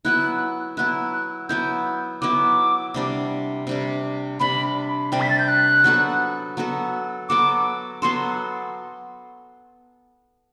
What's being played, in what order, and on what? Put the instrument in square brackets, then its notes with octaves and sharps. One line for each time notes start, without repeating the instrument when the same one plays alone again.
[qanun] F#3 B3 E4 [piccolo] F#6
[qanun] F#3 B3 E4 [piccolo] F#6
[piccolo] F#6
[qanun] F#3 B3 E4 [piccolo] G6
[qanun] F#3 B3 E4 [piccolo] D6
[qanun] C3 G3 D4
C3 G3 D4
[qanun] C3 G3 D4 [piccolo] B5
[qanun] C3 G3 D4 [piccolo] G5
[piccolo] B6
A6
G6
F#6
[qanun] F#3 B3 F#4 A4
F#3 B3 F#4 A4
[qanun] F#3 B3 F#4 A4 [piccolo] D6
[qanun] F#3 B3 F#4 A4 [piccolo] C6